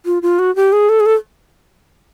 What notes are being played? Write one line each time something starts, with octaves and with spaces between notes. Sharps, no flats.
F4
F4
F#4
G4
G#4
A4
G#4
A4